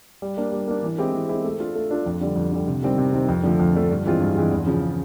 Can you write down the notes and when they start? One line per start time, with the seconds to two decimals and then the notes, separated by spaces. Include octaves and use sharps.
0.22 G3
0.37 A#3 D4
0.52 G3
0.68 A#3 D4
0.83 E3
0.98 G#3 C4 E4 G4
1.13 E3
1.29 G#3 C4 E4 G4
1.44 A3
1.60 D4 F4 A4
1.75 A3
1.91 D4 F4 A4
2.06 F2
2.21 D3 G3
2.36 F2
2.52 D3 G3
2.67 C3
2.83 D#3 G3 C4
2.98 C3
3.13 D#3 G3 C4
3.28 F2
3.43 D3 F3 A3
3.59 F2
3.75 D3 F3 A3
3.90 G2
4.06 E3 G#3 C4 F4
4.21 G2
4.36 E3 G#3 C4 F4
4.52 E2
4.66 C#3 F3